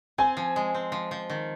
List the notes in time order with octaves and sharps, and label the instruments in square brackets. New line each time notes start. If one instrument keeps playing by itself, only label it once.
[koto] C4 [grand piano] G#5
[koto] F3
G#3
C4
F3
F3
D#3